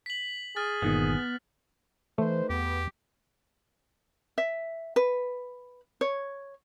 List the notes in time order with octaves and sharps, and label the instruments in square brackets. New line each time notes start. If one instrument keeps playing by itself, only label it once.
[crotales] B6 F#7
[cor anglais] G#4 [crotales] F6 A6
[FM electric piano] G1 A#2 D#3 [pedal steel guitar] B3
[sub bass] E3 [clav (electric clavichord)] A3 [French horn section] D#4 B4 C5
[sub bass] E2 [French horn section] B3 [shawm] G4
[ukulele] E5
B4
C#5